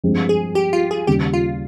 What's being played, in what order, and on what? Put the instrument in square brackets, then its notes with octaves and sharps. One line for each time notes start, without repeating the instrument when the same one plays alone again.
[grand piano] G2 F3 G#3 C4
[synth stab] G#4
G4
F4
G#4
[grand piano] D#2 C#3 G3 [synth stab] G4
[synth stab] F4